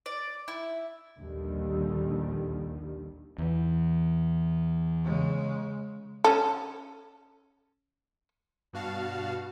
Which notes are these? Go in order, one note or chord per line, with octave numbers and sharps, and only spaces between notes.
D5
E4
A#1 D#2 D3 D#3 G3
E2 E3
C#3 G#3
C#4 A4
G2 B2 F#4 F5 A5